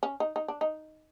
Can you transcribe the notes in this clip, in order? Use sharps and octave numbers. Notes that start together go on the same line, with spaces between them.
C#4
D#4
D#4
D4
D#4